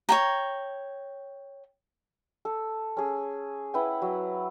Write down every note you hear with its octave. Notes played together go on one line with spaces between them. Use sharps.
C#5 G5 A#5
A4
C#4 G#4
E4 B4 F#5 G5
F#3